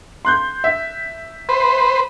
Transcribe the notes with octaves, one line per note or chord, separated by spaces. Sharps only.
C6 F#6 G6
E5
B4 C5